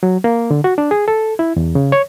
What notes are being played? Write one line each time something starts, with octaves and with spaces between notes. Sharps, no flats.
F#3
A#3
D3
F#4
D4
G#4
A4
E4
E2
C#3
C#5